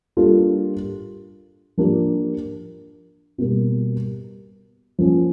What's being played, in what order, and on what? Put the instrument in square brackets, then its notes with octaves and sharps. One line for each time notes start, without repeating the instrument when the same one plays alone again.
[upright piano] G3 A#3 D4 F4 A4
F3 A#3 D4 G4
B2 G3 A#3
F3 A#3 C#4